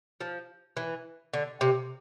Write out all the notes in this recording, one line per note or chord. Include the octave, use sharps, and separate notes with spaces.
F3
E3
D3
C3